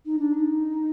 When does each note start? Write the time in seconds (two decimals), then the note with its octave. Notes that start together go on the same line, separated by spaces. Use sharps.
0.06 D#4
0.19 D4
0.34 D#4